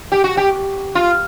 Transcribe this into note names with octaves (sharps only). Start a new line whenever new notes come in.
G4
F#4
G4
F4